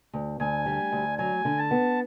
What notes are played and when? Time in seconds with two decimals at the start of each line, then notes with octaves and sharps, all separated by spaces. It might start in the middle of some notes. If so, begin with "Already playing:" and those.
0.13 D2
0.40 D2 G#5
0.66 G3
0.92 D2
1.18 F#3 G#5
1.45 D3
1.58 A5
1.71 B3